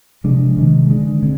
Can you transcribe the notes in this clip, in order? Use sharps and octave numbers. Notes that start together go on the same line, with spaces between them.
C3 F3 G#3 D4
C3 D#3 G#3
D3 G#3 D4
D3 G#3 C4